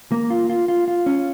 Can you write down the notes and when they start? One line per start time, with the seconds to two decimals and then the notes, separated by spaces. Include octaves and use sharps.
0.12 A#3
0.30 F4
0.50 F4
0.68 F4
0.88 F4
1.06 C#4